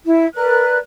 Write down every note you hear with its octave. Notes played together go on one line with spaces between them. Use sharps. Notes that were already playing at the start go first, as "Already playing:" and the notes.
E4
A#4 B4 D5 F#6